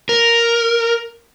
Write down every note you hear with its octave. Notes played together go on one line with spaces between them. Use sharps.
A#4